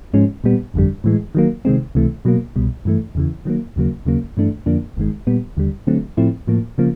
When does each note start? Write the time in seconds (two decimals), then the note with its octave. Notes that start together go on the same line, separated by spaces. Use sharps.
0.14 G#2 F3 G#3 C#4
0.44 A#2 G3 B3
0.74 G1 F2 D3 G3
1.04 A2 E3 G#3
1.35 D#3 F#3 A#3
1.65 C3 D#3 G#3 C4
1.95 C#2 C3 E3 A3
2.25 B2 F#3 A#3
2.56 C2 B2 G3
2.85 G2 E3 A3
3.15 E2 C#3 E3
3.45 D#3 F#3 A#3
3.76 D#2 C#3 F#3 A#3
4.05 D#2 C#3 F#3 A#3
4.37 G2 E3 A3 D4
4.66 F2 D3 F3 A#3 D4
4.97 G1 G2 D#3 G#3
5.27 A#2 G3 B3
5.57 D#2 D3 G3
5.87 D3 F#3 A3 C4
6.17 A2 F3 A3 C4 E4
6.47 A2 F3 A#3
6.78 C#3 F3 A#3